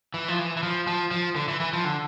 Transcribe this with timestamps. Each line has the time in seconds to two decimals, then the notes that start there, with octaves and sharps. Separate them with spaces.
0.14 E3
0.28 F3
0.39 E3
0.57 E3
0.63 F3
0.87 F3
1.11 F3
1.36 D3
1.48 E3
1.60 E3
1.73 F3
1.85 D3